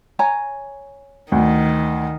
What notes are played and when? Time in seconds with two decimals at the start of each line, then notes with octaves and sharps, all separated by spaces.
0.19 C#5 G#5 A#5
1.32 D2 D#3